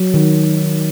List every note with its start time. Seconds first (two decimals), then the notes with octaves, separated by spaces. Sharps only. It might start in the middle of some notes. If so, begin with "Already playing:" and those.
Already playing: F#3
0.14 D#3